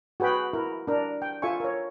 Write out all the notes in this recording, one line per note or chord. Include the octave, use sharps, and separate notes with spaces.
F#4 G#4 B4 G5 B5
E4 A#4
D4 A#4
G5
F4 A4 E5 G#5 C#6
A#4 C#5